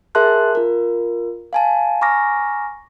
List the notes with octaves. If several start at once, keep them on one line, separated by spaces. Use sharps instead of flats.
G#4 A#4 E5 A5 C6 F#6
F4 A#4
F5 G#5 A5
G#5 A#5 C#6 D6 F6 A#6